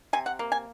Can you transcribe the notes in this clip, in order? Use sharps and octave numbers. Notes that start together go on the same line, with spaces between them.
C3 G#5
F#5
A#3
G#5